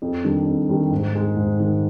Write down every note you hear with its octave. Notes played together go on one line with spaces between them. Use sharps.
F2
D#3 G3 D4
F2
D#3 G3 D4
G#2
D#3 G#3
G#2
D#3 G#3